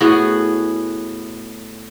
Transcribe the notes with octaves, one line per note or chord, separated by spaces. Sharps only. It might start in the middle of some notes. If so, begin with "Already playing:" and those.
A2 B3 F#4 G#4